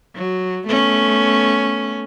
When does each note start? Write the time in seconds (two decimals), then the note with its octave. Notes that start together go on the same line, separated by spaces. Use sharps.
0.15 F#3
0.68 A3 B3 C#4